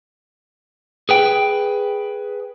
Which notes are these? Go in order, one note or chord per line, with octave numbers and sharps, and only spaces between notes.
G#4 B4 G5